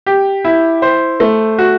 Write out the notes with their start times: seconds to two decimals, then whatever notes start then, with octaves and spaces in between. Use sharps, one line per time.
0.06 G4
0.45 E4
0.82 C5
1.20 A3
1.58 F#4